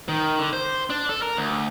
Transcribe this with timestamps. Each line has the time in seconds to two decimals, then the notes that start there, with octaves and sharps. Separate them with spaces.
0.09 D#3
0.39 D3
0.53 C5
0.90 D4
1.09 A4
1.22 A#4
1.37 D2